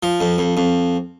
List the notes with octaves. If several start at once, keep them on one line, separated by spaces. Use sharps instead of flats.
F3
F2
F2
F2